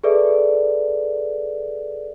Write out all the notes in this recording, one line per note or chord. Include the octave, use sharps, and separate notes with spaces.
G#4 A4 B4 D5 E5